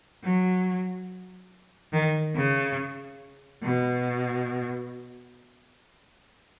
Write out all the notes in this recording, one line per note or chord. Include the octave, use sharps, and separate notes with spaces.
F#3
D#3
C#3
B2